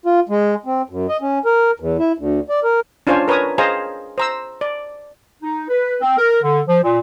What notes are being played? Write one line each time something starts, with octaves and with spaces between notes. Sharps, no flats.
F4
G#3
C4
F#2
D#5
C#4
A#4
E2
E4
D2
D5
A#4
C#4 D4 F4 C5 C#5 G#5
A#4 B4 C#5 A#5 D#6
G#4 C5 D#5 F5 G#5 A#5
C5 A#5 E6
D5
D#4
B4
C4
A#4
D3
F3
A#2